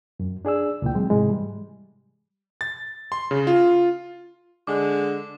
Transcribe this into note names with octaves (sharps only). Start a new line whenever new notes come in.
F#2
D4 G#4 D5 E6
C#2 A#2 E3 G5
F#3 G#3 C4
G#2 C3 E3 G#3
G3
A6
C6
C#3
F4
D3 G#3 D6